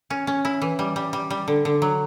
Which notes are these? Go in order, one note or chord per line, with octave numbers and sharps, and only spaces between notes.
C#4
C#4
E4
E3
G3
G3
G3
G3
D3
D3
F#3